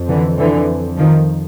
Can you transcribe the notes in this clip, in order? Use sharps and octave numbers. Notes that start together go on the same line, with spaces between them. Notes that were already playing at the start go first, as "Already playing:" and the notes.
Already playing: F2
D3 E3
D3 E3
D#3 F3